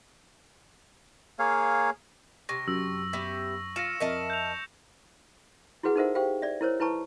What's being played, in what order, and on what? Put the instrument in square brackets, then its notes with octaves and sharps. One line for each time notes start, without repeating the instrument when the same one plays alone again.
[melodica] A#3 G#4 C#5 F5
[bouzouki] C3 [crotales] C#6 A#6
[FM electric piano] F#2 [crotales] E6
[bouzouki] B3 G4 E5
[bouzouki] F4 [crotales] A#6 C#7 E7
[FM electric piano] F2 E5 [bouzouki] A#4 D#5 A5
[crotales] G6 F7
[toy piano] E4 F#4 G#4 B4 F#5
D#4 A4 A#4 C5 E5 F#5
G4 C5 F5 G5
D5 E5
E4 A#4 C5 C#5
E4 B4 A5 A#5 C#6